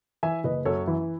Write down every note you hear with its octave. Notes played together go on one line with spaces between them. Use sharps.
E3 E5 G#5
F#1 B4 D#5
F#2 A4 C#5
E3 E4